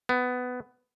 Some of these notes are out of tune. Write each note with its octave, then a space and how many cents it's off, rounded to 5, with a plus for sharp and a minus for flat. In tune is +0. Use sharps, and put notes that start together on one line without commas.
B3 +15